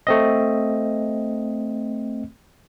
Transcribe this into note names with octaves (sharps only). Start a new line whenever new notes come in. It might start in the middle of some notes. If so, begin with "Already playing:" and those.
A3 C4 D#5